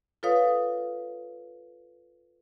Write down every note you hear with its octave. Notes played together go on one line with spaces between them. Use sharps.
F4 A4 B4 C#5 F5 D#6